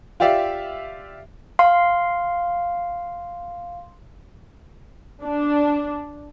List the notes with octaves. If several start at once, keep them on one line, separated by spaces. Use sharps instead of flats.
F4 G4 D5 E5 F5
F5 C6
D4